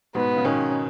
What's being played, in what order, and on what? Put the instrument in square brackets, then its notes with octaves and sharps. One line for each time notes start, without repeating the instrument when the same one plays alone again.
[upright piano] G#2 B2 [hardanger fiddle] B3
[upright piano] C#3
[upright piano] B2 D#3 [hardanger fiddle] C#4